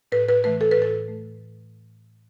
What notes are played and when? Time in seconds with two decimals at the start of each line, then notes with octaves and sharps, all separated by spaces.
0.12 A2 B4
0.29 B4
0.44 E3 A3 B4
0.61 A4
0.72 B4
0.77 A2 A4
1.08 A3